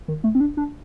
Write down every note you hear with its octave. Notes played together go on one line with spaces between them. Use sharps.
D#3
A3
C4
D4
D4